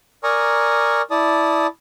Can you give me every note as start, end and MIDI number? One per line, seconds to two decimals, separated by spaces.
0.23 1.02 70
0.23 1.02 74
0.23 1.02 80
0.23 1.02 82
0.23 1.02 85
0.23 1.02 87
1.11 1.67 64
1.11 1.67 74
1.11 1.67 81
1.11 1.67 87